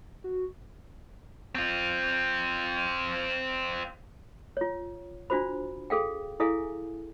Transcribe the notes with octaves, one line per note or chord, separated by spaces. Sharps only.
F#4
C4 F4
F4 C#5
D4 F4 F#4 C5 B5
G#4 A4 F5 G5
E4 G#4 A4 E5 F5 G#5